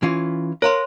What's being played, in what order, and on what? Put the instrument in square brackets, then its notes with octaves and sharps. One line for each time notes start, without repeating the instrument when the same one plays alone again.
[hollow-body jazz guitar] E3 C#4 F4
[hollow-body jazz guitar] A#4 F5 [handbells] C#5 A#5 C6